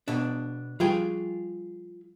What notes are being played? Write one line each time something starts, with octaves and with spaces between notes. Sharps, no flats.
B2 D4
F3 G3 F4 G#4 G5